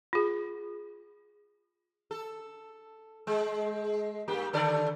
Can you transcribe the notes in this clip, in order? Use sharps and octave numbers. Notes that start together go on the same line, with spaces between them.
F4 G#4
A4
G#3
G2 A#3 G4
D3 A4 D5